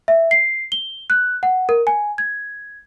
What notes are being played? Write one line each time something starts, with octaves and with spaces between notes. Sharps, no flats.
E5
C7
G7
F#6
F#5
A#4
G#5
G#6